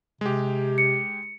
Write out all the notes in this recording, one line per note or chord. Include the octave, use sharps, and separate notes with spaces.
C3 G#3 G4
C#7